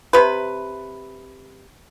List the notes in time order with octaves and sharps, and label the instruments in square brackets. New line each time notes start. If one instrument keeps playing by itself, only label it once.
[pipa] C3 B4